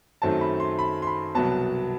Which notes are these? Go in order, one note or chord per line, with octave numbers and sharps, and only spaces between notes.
F#2 D#3 F#3 A3 C4 A5
B5
C6
B5
C6
B5
C2 B2 F#3 B3 A5